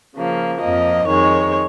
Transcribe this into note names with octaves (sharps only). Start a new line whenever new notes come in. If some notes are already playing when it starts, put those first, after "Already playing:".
C#3 F3 A#3
F2 F3 A#3 D#5
F2 D#3 G#3 C#5